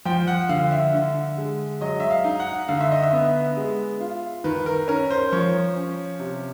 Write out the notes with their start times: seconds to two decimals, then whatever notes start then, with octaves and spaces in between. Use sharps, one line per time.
0.05 F3 G5
0.27 F#5
0.49 D3 F5
0.71 E5
0.94 D3
1.38 G#3
1.81 F#3 D#5
2.00 E5
2.10 F5
2.24 D#4
2.40 F#5
2.68 D3 F5
2.81 E5
2.91 D#5
3.04 E5
3.13 B3
3.57 G#3
4.01 F4
4.44 D#3 B4
4.66 A#4
4.88 C#4 A#4
5.10 C5
5.32 F3 C#5
5.76 C#4
6.19 C3